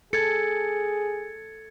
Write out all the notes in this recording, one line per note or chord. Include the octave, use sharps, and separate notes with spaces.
G#4 A4 G#6 A6 C#7